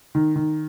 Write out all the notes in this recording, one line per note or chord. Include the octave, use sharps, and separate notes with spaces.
D#3
D#3